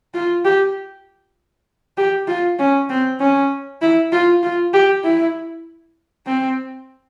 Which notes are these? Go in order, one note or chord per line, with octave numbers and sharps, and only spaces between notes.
F4
G4
G4
F4
C#4
C4
C#4
E4
F4
F4
G4
E4
C4